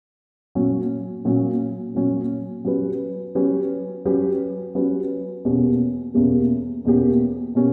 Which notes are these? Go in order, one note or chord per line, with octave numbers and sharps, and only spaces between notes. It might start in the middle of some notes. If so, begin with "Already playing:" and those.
A#2 F#3 C#4
A#2 F#3 C#4
A#2 F#3 C#4
F#3 C#4 G4 B4
F#3 C#4 G4 B4
F#3 C#4 G4 B4
F#3 C#4 G4 B4
E2 B2 A#3 C#4 G4
E2 B2 A#3 C#4 G4
E2 B2 A#3 C#4 G4
B2 A#3 C#4 G4